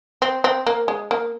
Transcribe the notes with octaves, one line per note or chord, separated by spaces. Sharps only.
C4
C4
A#3
G#3
A#3